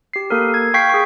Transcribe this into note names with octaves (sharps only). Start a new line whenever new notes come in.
G4 C7
A#3 A4 A#4
G#6
F5 G5 C#6 G6 B6 C7
G#4 C#6